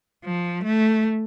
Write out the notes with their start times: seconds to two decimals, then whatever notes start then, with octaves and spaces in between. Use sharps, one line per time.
0.25 F3
0.64 A3